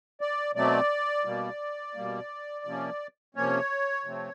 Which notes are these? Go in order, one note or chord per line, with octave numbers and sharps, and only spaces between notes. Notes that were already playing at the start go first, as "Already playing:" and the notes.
D5
B2 F#3 A3 C4 D5
B2 G3 A#3
B2 G3 A#3
C3 F3 A#3 C#4
C3 F3 A#3 C#4 C#5
C3 F3 A3 C4